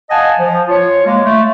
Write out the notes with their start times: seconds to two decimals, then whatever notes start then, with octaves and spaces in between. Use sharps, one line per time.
0.10 D#5 F5 F#5 G#5 A5
0.37 F3
0.69 F4 C#5
1.06 G#3 A#3
1.25 A3